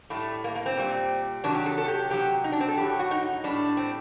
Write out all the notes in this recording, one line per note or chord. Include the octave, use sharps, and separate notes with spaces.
A2 G3 A3
A#3
A#3
C4
A#2 G3
C3 D#3 F#3 D4
G4
A4
A4
G4
C3 F#3 G4
D#4
D4
C4
A4
A2 F#3 G4
F#4
D#4
A2 G3 D4
C4